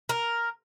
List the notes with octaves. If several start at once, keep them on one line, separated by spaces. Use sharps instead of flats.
A#4